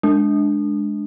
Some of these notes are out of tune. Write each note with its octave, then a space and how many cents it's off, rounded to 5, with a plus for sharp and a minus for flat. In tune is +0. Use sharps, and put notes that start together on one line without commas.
G#3 +10 D4 +0